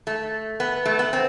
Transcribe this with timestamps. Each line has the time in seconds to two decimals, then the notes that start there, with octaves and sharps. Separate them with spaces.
0.07 A3
0.60 B3
0.86 A3
0.99 B3
1.13 C4